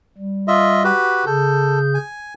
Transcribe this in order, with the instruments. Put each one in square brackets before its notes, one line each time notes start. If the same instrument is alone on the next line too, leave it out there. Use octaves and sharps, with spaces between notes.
[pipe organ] G3
[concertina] F4 D#5 E5
F#4 G4 B4
[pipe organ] C#3 G#4 G6 [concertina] A4
[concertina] G#5